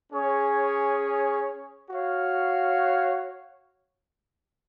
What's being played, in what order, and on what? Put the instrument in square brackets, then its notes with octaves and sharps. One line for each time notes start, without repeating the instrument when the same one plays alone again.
[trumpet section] C#4 G#4 C#5
F#4 C#5 F5